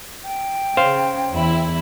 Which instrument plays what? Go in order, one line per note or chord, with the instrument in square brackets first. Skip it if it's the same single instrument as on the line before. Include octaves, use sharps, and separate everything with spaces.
[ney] G5
[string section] C#3 [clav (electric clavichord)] C5 F5
[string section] E2 E4